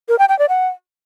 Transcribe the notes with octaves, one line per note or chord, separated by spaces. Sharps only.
A#4
G5
G5
D5
F#5